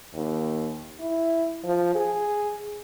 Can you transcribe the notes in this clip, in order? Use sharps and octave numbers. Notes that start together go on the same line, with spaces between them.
D#2
E4
F3
G#4